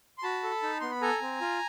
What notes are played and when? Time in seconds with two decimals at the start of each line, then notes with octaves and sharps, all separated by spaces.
0.18 C6
0.23 F#4 A5 B5
0.43 A4
0.63 D#4
0.81 B3 C6
0.91 B5
1.02 A4 G#5 A#5
1.21 C4
1.41 F4